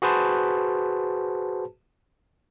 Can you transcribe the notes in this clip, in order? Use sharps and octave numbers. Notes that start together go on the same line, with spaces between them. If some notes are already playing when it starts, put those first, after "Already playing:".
F#4 G#4 B4 C5 A5